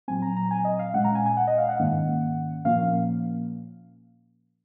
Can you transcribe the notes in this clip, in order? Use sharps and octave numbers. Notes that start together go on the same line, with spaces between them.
A#2 F#3 C4 G#5
A#5
A#5
G#5
D#5
F5
A#2 G#3 C#4 F#5
A#5
G#5
G#5
F#5
D#5
F5
F#5
G#2 D#3 A#3 C#4
A#2 F3 A#3 C#4 F5